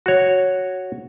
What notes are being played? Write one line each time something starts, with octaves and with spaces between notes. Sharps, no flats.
F#4 C#5